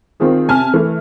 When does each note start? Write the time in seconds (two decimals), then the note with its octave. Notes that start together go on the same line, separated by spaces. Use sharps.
0.20 D#3 C4 F4 G#4
0.48 C3 G#5 A5 F6
0.74 E3 A3